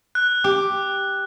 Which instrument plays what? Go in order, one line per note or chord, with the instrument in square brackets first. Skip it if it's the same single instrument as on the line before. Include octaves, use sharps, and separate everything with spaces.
[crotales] F#6
[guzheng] G4